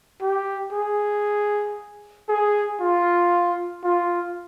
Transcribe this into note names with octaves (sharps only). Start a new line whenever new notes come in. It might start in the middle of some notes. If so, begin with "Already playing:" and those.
G4
G#4
G#4
F4
F4